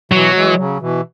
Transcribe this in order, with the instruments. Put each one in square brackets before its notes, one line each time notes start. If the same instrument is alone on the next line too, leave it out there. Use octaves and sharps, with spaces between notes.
[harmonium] B2 E3 [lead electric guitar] F#3
[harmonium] E3 G#3
C#3 F#3
B2 E3